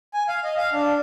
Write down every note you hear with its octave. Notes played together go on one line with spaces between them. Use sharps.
G#5
F5
D#5
F5
D4